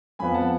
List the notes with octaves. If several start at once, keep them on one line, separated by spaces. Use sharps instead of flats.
F2 F3 B3 G#5 B5
F#5 A5